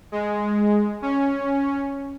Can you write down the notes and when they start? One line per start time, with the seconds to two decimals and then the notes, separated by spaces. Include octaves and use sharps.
0.12 G#3
1.02 C#4